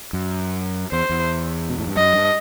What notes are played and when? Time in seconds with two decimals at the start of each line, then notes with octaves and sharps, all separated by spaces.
0.13 F#2
0.92 E2 C5
1.10 E2
1.70 B2
1.79 A2
1.87 G2
1.96 F#2 D#5
2.14 G2